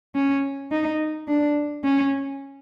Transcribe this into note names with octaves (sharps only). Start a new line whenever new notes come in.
C#4
D#4
D4
C#4